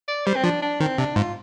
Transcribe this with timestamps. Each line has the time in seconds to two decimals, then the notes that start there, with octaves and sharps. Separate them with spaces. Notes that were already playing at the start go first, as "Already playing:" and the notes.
0.08 D5
0.26 G3 C5
0.36 C4
0.44 F3 D4
0.62 D4
0.80 D#3 C4
0.98 C3 D4
1.16 G#2 F4